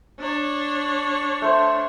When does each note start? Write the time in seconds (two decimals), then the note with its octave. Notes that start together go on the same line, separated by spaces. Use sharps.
0.20 D4 C#5
1.42 A3 C5